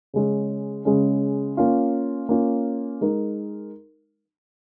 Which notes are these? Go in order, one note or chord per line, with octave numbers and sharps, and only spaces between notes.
C#3 G#3 C#4
C#3 G#3 C#4
A#3 C#4 F4
A#3 C#4 F4
G#3 D#4 A#4